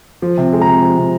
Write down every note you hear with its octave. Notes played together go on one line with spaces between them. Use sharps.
F3
C3
G#3
A#5
C3
F3
C3